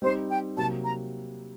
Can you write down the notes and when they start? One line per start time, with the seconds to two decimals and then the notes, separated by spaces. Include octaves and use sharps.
0.02 G3 C4 D#4 G4 C5
0.29 G5
0.57 C3 F#3 A#3 A5
0.84 A#5